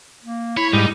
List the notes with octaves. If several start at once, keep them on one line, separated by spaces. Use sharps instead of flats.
A#3
E4 C#5 B5
G#2 G3 D#4